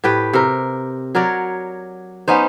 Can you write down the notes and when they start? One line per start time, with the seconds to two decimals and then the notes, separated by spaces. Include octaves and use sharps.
0.04 A2 G4 B4 G5
0.33 C3 A#4
1.15 F#3 A#4 C#5 D5
2.28 B3 C#4 D#4 C5